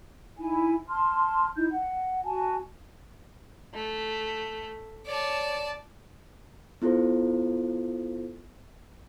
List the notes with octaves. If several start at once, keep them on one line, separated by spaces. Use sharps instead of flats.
D#4 E4 G#5
A5 C6 F6
D#4 E4 G6
F#5
F#4 G#5 A5
A3
C#5 D5 A5
B3 E4 F4 A4 C5